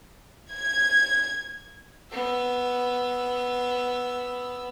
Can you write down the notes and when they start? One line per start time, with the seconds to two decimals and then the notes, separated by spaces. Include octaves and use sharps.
0.51 G#6
2.11 B3 E6